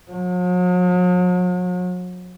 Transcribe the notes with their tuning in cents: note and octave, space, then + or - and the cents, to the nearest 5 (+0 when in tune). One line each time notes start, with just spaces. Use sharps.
F#3 -45